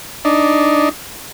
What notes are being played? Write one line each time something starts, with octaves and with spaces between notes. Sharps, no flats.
D4 D#4